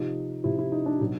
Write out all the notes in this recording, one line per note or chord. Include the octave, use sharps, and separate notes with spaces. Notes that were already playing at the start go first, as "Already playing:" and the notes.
Already playing: C3 F3 D#4
C3 F3 E4
E4
D#4
D4
B2 F#3 D#4